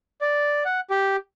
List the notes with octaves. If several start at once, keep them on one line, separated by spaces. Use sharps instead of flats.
D5
F#5
G4